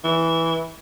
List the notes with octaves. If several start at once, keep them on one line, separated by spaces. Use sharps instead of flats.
E3